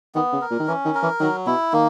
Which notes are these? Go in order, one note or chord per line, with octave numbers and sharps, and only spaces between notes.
D#3 B3
C#3
A#4
A#2
D#3
E3 C#4
D#3
A#4
E3
D#3 F#3
B2 E4
D#3 A#3